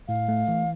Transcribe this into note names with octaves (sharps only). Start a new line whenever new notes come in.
A2 F5
A3
E3